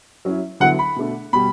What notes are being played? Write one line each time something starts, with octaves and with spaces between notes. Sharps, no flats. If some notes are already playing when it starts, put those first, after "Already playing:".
F#3 C#4 E4
D3 F#3 B3 E4 F#5
B5
B2 A3 D4
B2 G3 B5